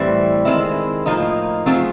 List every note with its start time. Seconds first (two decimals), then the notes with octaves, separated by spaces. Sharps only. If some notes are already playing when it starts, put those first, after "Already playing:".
Already playing: A2 E3 G3 C4
0.45 D#3 G#3 C4 E4
1.06 A2 F3 A#3 D#4
1.66 F#3 A3 C4 F4 G#4